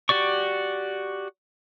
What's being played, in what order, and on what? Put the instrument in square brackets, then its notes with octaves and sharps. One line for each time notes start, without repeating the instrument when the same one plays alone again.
[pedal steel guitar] F#4 G4 D5 C#6